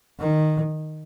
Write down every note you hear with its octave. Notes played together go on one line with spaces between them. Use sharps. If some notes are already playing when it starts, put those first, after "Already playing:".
D#3